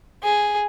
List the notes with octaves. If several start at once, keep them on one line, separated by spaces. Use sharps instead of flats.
G#4